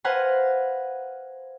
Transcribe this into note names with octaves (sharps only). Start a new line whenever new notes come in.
B4 C5 F5 F#5 G#5 A#5